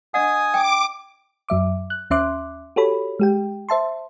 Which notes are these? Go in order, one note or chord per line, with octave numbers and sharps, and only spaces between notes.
D4 D#5 F#5 G#5 D#6
G5 D6
F#2 F#3 E5 D6
F#6
D#2 C#4 E5 C6 D6 F#6
F#4 G4 A4 C#5 B5
G#3 G4 G5
C5 E5 A5 C6